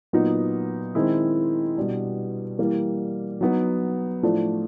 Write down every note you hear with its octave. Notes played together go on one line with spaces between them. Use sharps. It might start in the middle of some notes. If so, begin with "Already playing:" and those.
A#2 F#3 B3 D#4
D#3 G#3 C4 E4
B2 G3 B3 D4
E3 G3 A#3
F#3 B3 D#4
A2 F3 A3 D4